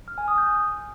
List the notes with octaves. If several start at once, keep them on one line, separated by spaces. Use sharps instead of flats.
F6
G#5
D#6
G6